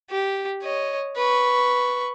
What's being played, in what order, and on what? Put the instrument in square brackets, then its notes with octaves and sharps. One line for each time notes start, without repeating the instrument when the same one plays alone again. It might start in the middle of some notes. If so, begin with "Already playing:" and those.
[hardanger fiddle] G4
C#5 D#5
B4 C#6